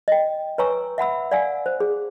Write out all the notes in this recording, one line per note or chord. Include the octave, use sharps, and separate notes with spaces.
D#5 G5
B4 C#5 G#5 A#5 C#6 E6
E5 F#5 B5 E6
D5 F5 F#5 G#5 E6
C5
G#4